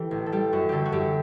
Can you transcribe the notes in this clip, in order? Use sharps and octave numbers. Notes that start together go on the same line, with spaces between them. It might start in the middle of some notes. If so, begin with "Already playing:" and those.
Already playing: E3 G4 A4
A1
A4
G3 G4
F#2 F#4
D3 G4 A4
F#4
F#2 G4